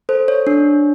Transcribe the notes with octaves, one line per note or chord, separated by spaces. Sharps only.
A4 C5
C#5
D4